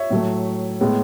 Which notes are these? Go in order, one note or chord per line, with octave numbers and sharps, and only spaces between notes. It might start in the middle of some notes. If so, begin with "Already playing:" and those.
Already playing: C#5 E5
A2 F#3 A3
A2 G#3 B3